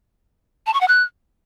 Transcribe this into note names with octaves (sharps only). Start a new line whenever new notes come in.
A5
C#6
F#5
F#6